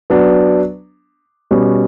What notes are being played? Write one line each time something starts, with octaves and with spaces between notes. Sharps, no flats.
F#3 B3 D4
B2 G3 C#4